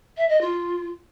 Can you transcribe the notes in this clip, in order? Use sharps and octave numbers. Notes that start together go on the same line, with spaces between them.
E5
D#5
F4